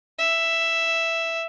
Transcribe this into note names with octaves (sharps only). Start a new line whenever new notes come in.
E5